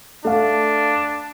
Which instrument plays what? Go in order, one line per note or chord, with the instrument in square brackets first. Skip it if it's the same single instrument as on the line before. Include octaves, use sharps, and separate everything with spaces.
[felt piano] A3 F5 [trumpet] D4